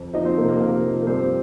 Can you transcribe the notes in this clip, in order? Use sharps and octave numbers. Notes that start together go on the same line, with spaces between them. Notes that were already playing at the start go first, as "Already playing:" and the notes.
Already playing: F2
F3 D#4 D#5
C4 C5
C3 A#3 A#4
A#3 A#4
C3 A#3 A#4
F3
A#4
G2 C4 C5